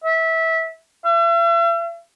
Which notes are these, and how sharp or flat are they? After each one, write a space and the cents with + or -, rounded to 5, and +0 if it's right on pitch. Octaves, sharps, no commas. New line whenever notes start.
E5 -20
E5 +45